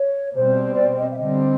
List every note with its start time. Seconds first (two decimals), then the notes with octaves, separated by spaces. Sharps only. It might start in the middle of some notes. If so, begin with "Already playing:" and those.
Already playing: C#5
0.35 B2 G3 C4 C5
0.75 D5
0.97 D#5
1.12 E5
1.17 D3 G3 C4 D#5